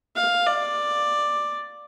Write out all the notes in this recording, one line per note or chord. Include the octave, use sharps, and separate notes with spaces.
F5
D5